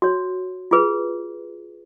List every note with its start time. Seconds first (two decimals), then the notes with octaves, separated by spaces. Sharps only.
0.02 F#4 C#5
0.71 F4 G#4 B4